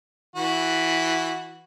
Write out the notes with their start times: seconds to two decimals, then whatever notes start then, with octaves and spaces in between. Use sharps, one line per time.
0.36 E3 F#4